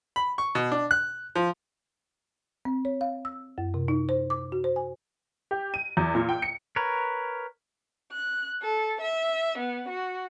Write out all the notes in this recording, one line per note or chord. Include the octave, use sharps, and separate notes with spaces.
B5
C#6
B2
D4
F#6
F3
C4
C#5
F5
E6
F#2
C3
D#4
C5
D6
F#4
C5
G#5
G4
D#7
E2
A#2
G5
C#7
A#4 B4 C#5
F#6
A4
E5
B3
F#4